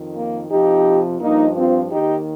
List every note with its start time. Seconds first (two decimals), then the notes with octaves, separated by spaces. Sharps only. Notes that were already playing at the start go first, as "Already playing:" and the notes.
Already playing: F2 D#3
0.15 A#3
0.50 F2 C3 F3 D#4 G4
1.20 G2 F3 A#3 D#4
1.56 C4 F4
1.91 D#2 D#3 D#4 G4